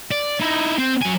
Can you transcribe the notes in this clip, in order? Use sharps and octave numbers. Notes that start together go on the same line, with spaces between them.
D5
D#4 E4
C4
F#3 G#5